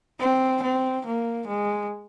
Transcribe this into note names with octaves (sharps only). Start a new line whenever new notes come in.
C4
C4
A#3
G#3